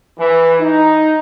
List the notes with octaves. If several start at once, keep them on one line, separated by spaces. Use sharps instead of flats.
E3
D#4